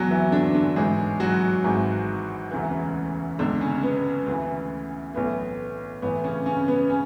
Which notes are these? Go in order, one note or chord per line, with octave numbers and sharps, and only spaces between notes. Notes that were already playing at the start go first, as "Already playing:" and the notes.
Already playing: E1 E2 B2 F#3 F#4
E3 E4
D3 D4
D3 D4
A1 G#2 E3 G#3 G#4
F#3 F#4
G#1 G#2 E3
E1 D2 C#3 E3
C#2 B2 D3 D4
C#3 C#4
B3
D2 C#3 E3
B1 A2 E3 B3
A1 A2 E3 B3
C#3 C#4
C#3 C#4
B3
C#3 C#4